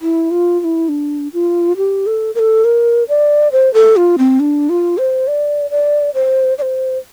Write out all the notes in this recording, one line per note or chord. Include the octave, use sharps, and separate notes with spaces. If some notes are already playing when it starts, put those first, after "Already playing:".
E4
F4
F4
E4
D4
F4
G4
A4
A#4
A4
A#4
D5
C5
A4
F4
C4
D4
F4
C5
D5
D5
C5
D5
C5